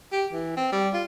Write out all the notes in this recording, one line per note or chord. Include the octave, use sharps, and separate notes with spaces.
G4
E3
C4
G3
F4